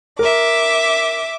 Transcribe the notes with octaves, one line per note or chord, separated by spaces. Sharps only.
A#4 E5 D6